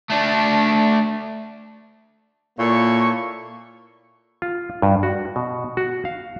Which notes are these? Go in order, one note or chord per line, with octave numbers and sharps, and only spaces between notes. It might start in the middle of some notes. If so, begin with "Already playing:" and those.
A3 D4
A#2 A#3 E4 A4 C#5 C#6
F4
G2
F#4
B2
F#4
F5